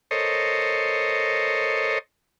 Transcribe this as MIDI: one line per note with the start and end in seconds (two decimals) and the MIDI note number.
0.11 1.99 69
0.11 1.99 70
0.11 1.99 72
0.11 1.99 73
0.11 1.99 75